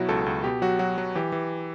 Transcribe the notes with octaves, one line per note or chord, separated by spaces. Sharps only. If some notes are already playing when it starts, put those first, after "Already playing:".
Already playing: B2 F#3 E4 F#4
C#2 A4
C#2
B2 G4
F#3 F#4
F#3 F#4
F#3
E3 G4
E3